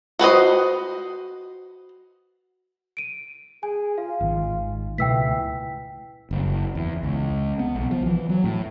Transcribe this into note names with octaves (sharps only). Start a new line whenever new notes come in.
F#4 B4 C5 D#5
D7 D#7
G#4 G#5
F4 F5
G#1 D#3
C#2 B2 E3 A3 G5 E6 B6
F#1
E2
C#2
B3
B1
F3
E3
F#3
A2